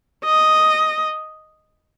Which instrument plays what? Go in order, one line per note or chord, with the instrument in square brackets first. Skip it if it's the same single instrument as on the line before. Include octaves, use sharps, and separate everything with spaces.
[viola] D#5